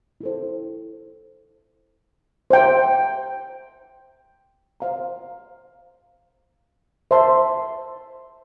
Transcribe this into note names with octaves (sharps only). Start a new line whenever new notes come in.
E4 A4 C5
C5 E5 G5 A#5
C5 F5 A#5
C5 E5 A5 C6